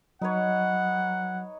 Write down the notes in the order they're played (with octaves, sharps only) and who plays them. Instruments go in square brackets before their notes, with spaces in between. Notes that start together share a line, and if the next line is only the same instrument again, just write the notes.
[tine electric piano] F#3 [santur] D#4 B4 C#5 [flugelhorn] F#5